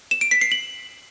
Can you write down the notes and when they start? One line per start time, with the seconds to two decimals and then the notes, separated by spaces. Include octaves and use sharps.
0.11 E7
0.21 D7
0.31 B6
0.41 C7
0.52 F#7